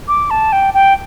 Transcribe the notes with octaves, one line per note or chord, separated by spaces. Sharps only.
D6
A5
G5
G5